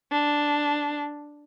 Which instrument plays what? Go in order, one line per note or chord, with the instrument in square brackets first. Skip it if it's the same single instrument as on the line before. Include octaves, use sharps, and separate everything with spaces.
[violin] D4